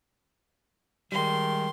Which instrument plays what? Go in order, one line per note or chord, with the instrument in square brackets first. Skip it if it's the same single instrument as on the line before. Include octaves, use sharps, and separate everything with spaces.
[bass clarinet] D#3 [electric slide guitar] G3 G#3 [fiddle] C6